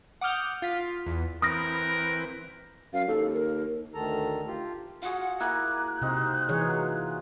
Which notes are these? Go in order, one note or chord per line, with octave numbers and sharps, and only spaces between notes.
F#5 D6 D#6 F6 G6
F4 B6
E2
E3 C4 A#4 B4 D#6 F6 A#6
F#2 F5
D#2 A4
A#4
D2 D#3 A4 A#5
F4 G4
F4 F#4 G#4 F#5
A#3 E4 G#4 F#6
C3 C4 D#4 C5
E3 G#4 C#5
F#3 F4